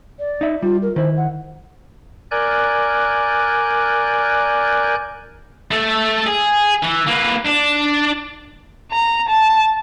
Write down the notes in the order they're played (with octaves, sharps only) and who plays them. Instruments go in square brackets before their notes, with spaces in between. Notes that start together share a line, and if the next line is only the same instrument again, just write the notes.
[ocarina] D5
[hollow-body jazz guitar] D#4 E5
[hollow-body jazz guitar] G3 [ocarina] F4
[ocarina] A#4
[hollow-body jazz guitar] D#3 E4 [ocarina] C5
[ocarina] F#5
[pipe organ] A#4 D5 G#5 F#6 G6
[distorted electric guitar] A3 A4
G#4
E3
A#3 B4
D4
[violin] A#5
A5